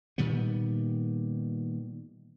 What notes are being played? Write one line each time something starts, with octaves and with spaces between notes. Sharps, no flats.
A#2 D#3 G3 B3